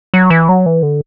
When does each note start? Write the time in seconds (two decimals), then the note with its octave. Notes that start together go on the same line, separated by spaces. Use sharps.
0.14 F#3
0.30 E3
0.49 F#3
0.66 E3
0.82 D3